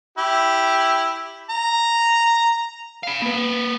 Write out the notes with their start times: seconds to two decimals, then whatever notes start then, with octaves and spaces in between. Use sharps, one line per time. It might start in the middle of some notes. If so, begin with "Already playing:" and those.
0.18 E4 G4
1.50 A#5
3.03 F5 B5
3.22 A#3 B4